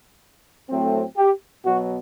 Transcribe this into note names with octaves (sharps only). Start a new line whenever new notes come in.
A2 F#3 A3 C4
G4
B2 F#3 B3 F#4